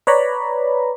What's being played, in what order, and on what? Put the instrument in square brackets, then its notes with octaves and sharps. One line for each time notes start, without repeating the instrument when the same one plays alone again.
[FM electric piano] B4 C#5 D5 A#5 B5